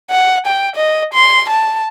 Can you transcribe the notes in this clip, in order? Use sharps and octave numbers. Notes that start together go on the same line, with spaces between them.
F#5
G5
D#5
C6
A5